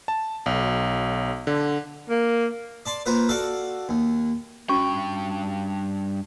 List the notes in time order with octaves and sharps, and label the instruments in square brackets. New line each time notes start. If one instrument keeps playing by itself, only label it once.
[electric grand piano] A5
B1
D3
[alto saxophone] A#3
[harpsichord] D5 A5 C6
A#3 F4 B4 C5
F#4 A4 D5 F5
D#2
[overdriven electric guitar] G2 G5 [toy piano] C#4 F#4 C#6